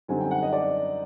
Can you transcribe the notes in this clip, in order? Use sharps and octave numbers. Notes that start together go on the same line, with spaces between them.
F#2 D3 G3 C4 D#4 G#5
G5
F#5
D#5
D5